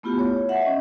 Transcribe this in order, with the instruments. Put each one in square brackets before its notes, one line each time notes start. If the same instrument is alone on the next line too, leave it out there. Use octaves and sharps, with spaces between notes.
[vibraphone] A3 B3 E4 F4 G4
C#5
E5 F#5
C#4 D#5